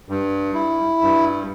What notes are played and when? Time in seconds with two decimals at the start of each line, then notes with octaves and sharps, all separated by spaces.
0.09 G2
0.54 E4
1.01 G2